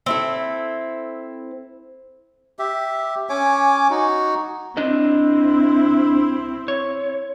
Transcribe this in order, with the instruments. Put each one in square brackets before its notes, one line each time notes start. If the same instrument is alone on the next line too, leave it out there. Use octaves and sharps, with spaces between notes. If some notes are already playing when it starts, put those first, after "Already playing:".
[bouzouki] C4 E4 A4
[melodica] G4 E5
C#4 C#5 G#5 D6
D#4 F#4
[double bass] C4 E4 [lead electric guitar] D4 D#5
[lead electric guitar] C#5